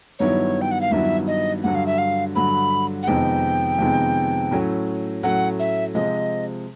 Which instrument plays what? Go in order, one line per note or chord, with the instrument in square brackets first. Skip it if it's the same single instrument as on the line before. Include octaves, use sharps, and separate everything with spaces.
[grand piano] G2 D#3 F#3 B3 E4 [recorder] C#5
[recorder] G5
F#5
F5
[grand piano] G2 D#3 F#3 B3 E4 [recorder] E5
[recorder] D#5
[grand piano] G2 D3 F#3 [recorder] F#5
[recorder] F5
E5
F5
[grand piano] G2 D3 F#3 [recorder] B5
[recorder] F#5
[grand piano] F2 C3 D#3 G#3 B3 [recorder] G5
[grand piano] F2 C3 D#3 G#3 B3
A2 F#3 A3 C#4
[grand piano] A2 F#3 A3 C#4 [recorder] F#5
[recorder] E5
[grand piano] C3 F3 G#3 [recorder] D#5